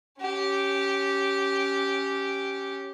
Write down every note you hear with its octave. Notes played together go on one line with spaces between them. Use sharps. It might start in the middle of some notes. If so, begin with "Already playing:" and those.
C#4 G4